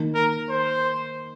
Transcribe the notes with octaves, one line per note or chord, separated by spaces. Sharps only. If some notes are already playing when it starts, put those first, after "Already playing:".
Already playing: D#3 A#3 D#4
A#4
C5